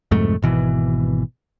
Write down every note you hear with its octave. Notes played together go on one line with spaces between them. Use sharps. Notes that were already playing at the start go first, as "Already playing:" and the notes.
C2 F2 G#2 A3
G#1 B2 E3